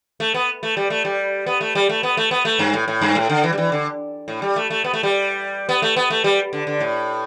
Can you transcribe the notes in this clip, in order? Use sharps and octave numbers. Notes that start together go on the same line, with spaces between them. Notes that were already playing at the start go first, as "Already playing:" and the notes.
A3
B3
A3
G3
A3
G3
B3
A3
G3
A3
B3
A3
B3
A3
G2
A2
A2
G2
A2
D3
E3
G3
E3
D3
A2
G3
A3
A3
B3
A3
G3
B3
A3
B3
A3
G3
D3
D3
A2